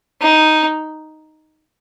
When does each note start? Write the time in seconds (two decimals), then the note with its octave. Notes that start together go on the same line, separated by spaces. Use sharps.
0.21 D#4